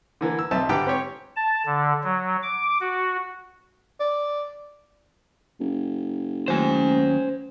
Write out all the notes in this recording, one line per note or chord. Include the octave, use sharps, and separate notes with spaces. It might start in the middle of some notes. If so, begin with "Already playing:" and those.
D3 E3 A#3
E6
B1 C4 E5 A5
G#2 D3 G4 B4 G5 D6
C4 G4 C#5
A5
D3
F#3
D6
F#4
D5
F#1
D#2 F#3 C#4 C5 G#5